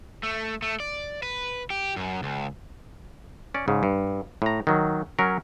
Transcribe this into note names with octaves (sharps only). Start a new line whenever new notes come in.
A3
A3
D5
B4
G4
F#2
C#2
C#4 D5
G#2 C#3
G2
A2 A#5
D#3 F#3
F#3 C#4 A#4